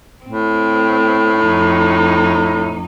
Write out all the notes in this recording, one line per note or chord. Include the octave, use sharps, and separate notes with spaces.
A2 C4
F2 D#4